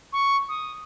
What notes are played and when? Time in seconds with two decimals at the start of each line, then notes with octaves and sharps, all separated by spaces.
0.13 C#6
0.49 D#6